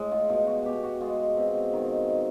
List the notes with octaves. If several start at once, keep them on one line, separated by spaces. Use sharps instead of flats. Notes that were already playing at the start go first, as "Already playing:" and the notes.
Already playing: A2 G#3
F4
B2 F4
F#4
B2 G4
F#4
G#3 F4
B2 C4
D#3